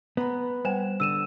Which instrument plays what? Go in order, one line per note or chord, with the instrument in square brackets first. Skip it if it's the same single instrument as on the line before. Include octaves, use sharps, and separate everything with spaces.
[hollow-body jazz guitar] B3 [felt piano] A#5 B5
[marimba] G3 [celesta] C5 E7 [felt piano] F#5 G#5
[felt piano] D3 [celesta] E6 D#7 E7